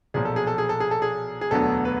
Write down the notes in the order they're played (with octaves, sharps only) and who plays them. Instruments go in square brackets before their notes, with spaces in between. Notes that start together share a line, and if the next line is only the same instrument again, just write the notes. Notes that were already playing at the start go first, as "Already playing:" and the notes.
[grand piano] B1 A#2 F3 G#4
A4
G#4
A4
G#4
A4
G#4
A4
G#4
G#4
E1 D2 D3 F#3 B3 A4
B4